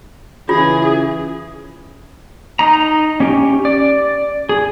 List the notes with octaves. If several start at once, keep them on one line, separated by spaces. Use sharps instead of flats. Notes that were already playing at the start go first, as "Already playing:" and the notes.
C#3 E3 F4 G#4
D#4 A#5
C#4 G4
D5
G#4